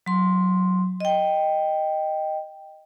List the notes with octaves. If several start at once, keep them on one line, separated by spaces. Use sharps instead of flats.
F#3 C6
D#5 G5